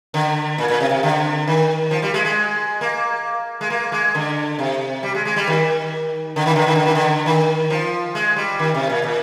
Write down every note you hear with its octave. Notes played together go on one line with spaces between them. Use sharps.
D3
A#2
A#2
C3
C3
D3
D#3
F3
G3
G#3
G#3
A#3
G#3
A#3
G#3
D3
C3
G3
G#3
G#3
G3
D#3
D3
D#3
D3
D#3
D3
D#3
D3
D#3
F3
G#3
G3
D#3
C3
A#2
A#2